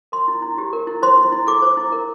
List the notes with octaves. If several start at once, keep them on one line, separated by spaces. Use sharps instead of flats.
A#4 C6
E4
E4
G4
A#4
E4
C5 C6
E4
E4
A4 D6
C5
E4
A#4